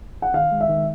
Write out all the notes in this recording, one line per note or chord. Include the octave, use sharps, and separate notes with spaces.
F#5
D#3 F5
G#3
E5
D#3